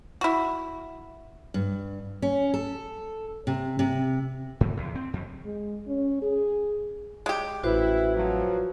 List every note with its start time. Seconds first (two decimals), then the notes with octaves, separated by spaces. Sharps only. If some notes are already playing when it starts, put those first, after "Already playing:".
0.21 E4 F#4
1.54 G2
2.22 C#4
2.54 A4
3.47 C3
3.79 C3
4.61 G#2
4.77 E2
4.95 C4
5.13 F2
5.45 G#3
5.87 C#4
6.22 G#4
7.26 G#3 G4
7.64 A1 E4 F#4 B4 C5
8.15 F3 F#3